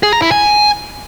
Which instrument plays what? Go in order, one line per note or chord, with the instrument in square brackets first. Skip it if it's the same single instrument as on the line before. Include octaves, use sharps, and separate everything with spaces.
[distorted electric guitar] G#4
A#5
E4
G#5